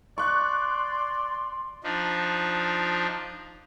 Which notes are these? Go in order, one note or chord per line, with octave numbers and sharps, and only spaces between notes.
D5 C6 C#6 F#6
F3 D4 D#4